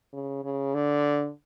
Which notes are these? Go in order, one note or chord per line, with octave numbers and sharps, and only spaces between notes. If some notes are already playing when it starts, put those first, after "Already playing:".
C#3
C#3
D3